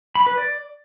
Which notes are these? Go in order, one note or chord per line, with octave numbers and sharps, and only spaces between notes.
B5
B4
D5